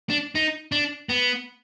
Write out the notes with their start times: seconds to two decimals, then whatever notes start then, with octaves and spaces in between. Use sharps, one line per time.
0.09 D4
0.35 D#4
0.72 D4
1.09 B3